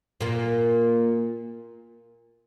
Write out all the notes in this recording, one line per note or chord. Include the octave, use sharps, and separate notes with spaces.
A#2 A#3